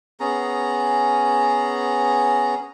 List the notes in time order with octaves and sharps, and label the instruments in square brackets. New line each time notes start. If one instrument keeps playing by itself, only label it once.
[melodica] B3 C#4 G#4 A#5